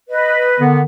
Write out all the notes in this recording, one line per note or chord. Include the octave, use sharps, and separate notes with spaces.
B4 D#5
D3 D#3 B3